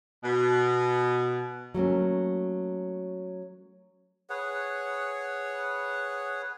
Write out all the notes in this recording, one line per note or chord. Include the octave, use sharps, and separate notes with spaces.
B2
F#3 A3 A#3 C#4
G#4 B4 C#5 F#5